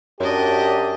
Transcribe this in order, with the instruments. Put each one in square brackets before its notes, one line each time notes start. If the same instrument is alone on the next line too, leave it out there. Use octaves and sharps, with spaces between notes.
[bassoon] F#2 [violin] D4 D#5 [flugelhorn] G4